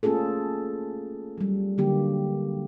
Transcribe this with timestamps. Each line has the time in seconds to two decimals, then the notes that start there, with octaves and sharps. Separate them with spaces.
0.03 A3 A#3 C#4 F4 G#4 A4
1.38 F#3 G3
1.78 D3 F#3 A#3 G4